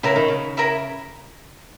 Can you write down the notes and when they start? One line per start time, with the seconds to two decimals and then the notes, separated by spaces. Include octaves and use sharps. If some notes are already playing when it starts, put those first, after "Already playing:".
0.03 C#3 E4 A#4 E5 B5
0.16 D#3
0.28 C#3
0.57 E4 A#4 E5 B5